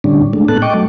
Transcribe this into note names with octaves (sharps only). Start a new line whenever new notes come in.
A2 D3 G3 C#4 D4
G#3 A3 D4
A2 B3 A4 A5 F#6
D#5 G5 C#6 D6
F#3 A3